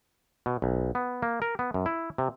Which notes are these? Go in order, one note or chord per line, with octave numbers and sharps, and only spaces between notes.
B2
B1
B3
A#3
A#4
B3
F#2
E4
C3